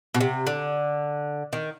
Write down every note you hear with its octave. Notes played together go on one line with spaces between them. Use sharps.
B2
C3
D3
D#3